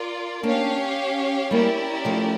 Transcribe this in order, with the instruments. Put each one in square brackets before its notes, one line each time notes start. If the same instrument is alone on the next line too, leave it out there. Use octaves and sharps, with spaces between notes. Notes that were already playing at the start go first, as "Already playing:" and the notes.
Already playing: [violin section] F4 A#4 D5
[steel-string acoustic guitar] A#3 D4 [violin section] C#4 G4 C#5 F5
[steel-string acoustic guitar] G3 A#3 [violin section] C#4 E4 G4 A#4 D5
[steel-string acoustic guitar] F3 A3